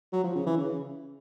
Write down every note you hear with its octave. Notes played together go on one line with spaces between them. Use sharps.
F#3
F3
C#3
E3
C#3